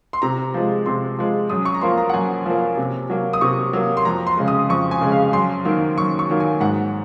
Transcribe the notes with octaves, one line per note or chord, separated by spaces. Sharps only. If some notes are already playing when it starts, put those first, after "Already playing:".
C6
C3 A#5
F3 G#3
C3 C6
F3 G#3
F#2 D#6
C#6
A#5
F3 A#3 C6
A#5
F#5
F#2 G#5
F3 A#3
C3
F#3 A#3
D#6
C3 C#6
F#3 A#3
C6
F2 A#5
C6
C#3 G#3
D#6
F2 C#6
G#5
C#3 G#3
F5
F#2 C6
D#3 F#3 A#3
F#2 C#6
C#6
D#3 F#3 A#3
G#5
G#2 F#5